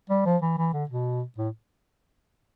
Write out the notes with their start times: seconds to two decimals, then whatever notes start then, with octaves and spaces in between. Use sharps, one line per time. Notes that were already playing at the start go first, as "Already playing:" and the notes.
0.10 G3
0.26 F3
0.42 E3
0.58 E3
0.73 D3
0.89 B2
1.38 A2